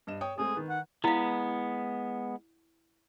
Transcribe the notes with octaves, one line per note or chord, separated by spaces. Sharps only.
G2 D#5 E7
C#5 G5 D#6
G#3 A3 C4 G#4
D#3 B4
F#5
G#3 B3 E4 F5